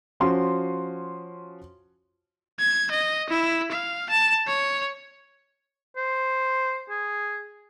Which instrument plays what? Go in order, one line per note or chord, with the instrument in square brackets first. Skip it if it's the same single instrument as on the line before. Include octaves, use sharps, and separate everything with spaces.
[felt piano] F3 C#4 F#4 C6
[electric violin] G#6
D#5
E4
F5
A5
C#5
[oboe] C5
G#4